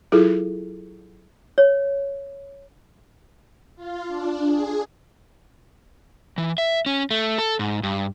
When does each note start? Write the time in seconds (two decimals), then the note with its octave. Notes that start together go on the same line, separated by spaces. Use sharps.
0.12 F#3 E4 F4 G#4 A4
1.58 C#5
3.76 F4
4.07 D4
4.45 G#4
6.38 E3
6.58 E5
6.86 C#4
7.11 A3
7.38 A4
7.59 G#2
7.83 G2